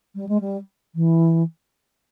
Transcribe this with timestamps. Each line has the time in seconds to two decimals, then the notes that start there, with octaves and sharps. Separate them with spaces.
0.15 G3
0.29 G#3
0.41 G3
0.95 E3